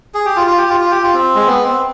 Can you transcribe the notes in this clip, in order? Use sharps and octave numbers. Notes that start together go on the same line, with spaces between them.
G#4
G4
F4
F4
G4
F4
F4
G4
F4
C4
G#3
B3
C4